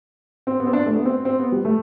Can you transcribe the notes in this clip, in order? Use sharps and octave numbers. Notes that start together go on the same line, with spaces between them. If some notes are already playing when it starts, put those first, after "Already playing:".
C4
B3
C4
D4
A3
B3
C4
C4
B3
G3
A3